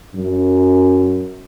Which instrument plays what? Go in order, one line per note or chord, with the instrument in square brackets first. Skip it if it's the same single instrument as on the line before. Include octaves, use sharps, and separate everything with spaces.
[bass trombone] F#2